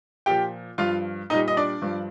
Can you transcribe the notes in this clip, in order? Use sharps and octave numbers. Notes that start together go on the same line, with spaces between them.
A#2 F3 G4 G5
G2 F3 F4 F5
A#2 G3 D#4 D#5
D#5
D4 D5
G2 F3